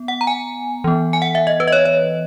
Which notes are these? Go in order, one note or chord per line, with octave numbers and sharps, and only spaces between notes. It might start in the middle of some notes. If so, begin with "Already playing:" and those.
Already playing: B3
F#5
A#5
G#5
E3 B3
G#5
F#5
E5
D#5
B4
D#5
C#5
C#5